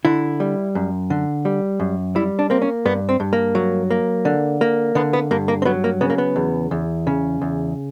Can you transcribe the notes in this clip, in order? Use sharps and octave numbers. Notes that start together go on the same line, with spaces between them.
D3 E4
G3
F#2
D3
G3
F#2
G3 E4
D4
A#3 C4
C#4
G2 B3
C4
G2
A#3
F#3
A#3
D3
A#3
D3 B3
B3
G2 A#3
A#3
C4
F#3 B3
A#3
C#3 B3
A#3
B3
E2
E2
C#3
E2